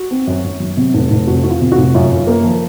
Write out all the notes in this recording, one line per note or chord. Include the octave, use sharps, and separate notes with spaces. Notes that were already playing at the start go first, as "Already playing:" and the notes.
Already playing: F#4
C4
F#2
F#2
F#3
C3
F1
F1
F2 F#4
F2 F#4
F4
C3
F#4
F1
F#2 F4
F#2
A#3
F3